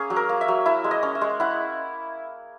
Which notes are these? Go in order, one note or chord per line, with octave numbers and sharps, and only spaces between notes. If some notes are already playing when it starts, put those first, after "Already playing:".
Already playing: A#3 C#4 G#4
F#3
A#4
A#3
E5
F#3
E4 E5
G#3
D#5
C#4
E5
G#3
E4 F#5